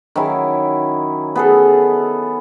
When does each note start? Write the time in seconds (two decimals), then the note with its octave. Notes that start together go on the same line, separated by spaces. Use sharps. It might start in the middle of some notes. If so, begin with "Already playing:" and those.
0.16 D#3 F#3 C#4 E4
1.35 B3 G#4 A4